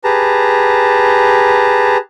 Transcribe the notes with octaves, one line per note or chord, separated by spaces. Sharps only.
G4 G#4 B4 A5 A#5